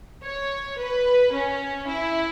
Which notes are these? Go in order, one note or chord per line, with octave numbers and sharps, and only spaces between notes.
C#5
B4
C#4
E4